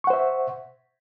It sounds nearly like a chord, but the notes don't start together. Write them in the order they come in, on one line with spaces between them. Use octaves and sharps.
C#6 F#5 C5 E5